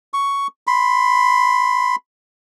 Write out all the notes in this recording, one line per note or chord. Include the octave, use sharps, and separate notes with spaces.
C#6
B5 C6